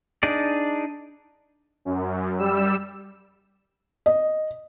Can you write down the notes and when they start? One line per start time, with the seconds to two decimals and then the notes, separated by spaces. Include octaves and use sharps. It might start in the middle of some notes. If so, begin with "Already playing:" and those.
0.23 D4 D#4 G#4 D5
1.85 F#2
2.39 G3 E6
4.06 D#5